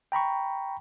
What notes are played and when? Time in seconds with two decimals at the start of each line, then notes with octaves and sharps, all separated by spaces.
0.12 G5 A#5 B5 C#6